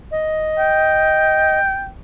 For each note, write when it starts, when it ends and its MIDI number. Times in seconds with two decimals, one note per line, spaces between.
0.12 1.59 75
0.59 1.88 79